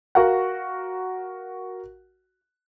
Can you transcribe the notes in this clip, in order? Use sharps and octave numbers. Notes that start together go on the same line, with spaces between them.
F#4 A#4 F5 F#5